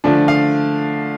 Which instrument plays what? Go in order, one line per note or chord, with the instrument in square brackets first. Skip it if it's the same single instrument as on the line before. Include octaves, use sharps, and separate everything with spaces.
[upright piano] D3 F3 A3 D4
F5